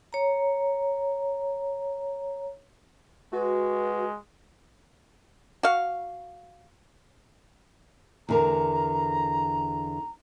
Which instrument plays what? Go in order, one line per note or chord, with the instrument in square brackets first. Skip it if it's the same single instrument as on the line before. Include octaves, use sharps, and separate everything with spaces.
[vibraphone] C#5 A#5
[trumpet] G#3 [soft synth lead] F#4 [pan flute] B4
[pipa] F#4 F5
[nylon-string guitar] E2 D3 A#4 [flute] A#5